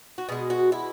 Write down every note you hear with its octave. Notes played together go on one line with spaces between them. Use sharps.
F#4
B2 G#3 G#4
F#4
E4